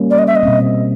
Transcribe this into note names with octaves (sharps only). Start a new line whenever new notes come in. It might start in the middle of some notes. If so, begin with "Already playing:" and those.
Already playing: G3 A#3 C#4
D5
D#5
E5
D#5
B2 G3 C4